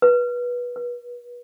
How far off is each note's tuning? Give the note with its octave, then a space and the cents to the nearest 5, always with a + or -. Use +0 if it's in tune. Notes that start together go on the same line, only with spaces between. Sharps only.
B4 -20
B4 -35